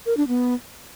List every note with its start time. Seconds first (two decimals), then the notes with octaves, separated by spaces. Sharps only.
0.06 A#4
0.17 D4
0.28 B3